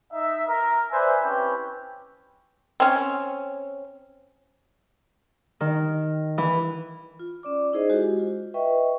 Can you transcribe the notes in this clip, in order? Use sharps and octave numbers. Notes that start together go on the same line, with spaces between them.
D#4 E5
A#4
B4 C5 D5 E5 G#5
C4 C#4 E4 G4 B4
C4 C#4
D#3
E3
F4
C#4 D5 D6
D#4 E4 G#4 C5 D#5
G#3 F#4 G4
F4
B4 D#5 E5 G5 C#6